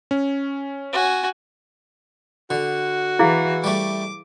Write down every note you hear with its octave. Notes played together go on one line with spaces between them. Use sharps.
C#4
F#4 G#5
D3 F#4
E3 E4 G#4 F5
G3 A3 D6